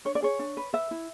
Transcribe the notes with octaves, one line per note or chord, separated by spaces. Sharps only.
D4 C#5
D5
G#4 C#5
D4
B4
B4 E5
E4